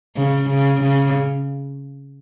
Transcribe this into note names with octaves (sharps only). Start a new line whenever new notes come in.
C#3
C#3
C#3